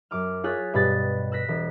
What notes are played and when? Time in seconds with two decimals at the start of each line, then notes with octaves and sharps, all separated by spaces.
0.11 F#2 D6 F6
0.43 F4 G#4 C#5 F#6 A6 B6
0.74 G2 B2 G4 B5 F#6 A6
1.32 E6 F#6 A#6 B6
1.49 E1